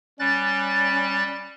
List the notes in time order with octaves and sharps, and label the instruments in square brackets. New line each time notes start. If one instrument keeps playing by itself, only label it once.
[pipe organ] G3 F#6 A6 [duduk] C#4